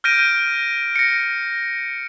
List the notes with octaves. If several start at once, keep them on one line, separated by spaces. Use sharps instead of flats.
F6 G6 A#6 D7 D#7
A#6 C#7